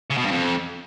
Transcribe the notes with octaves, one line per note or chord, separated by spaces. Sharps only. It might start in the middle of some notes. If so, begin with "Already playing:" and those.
C#3
B2
G2
F2